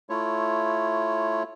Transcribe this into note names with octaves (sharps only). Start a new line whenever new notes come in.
A3 E4 F4 C#5